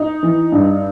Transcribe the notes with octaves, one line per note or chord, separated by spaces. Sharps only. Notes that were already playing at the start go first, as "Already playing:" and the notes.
Already playing: D#4
E3
G2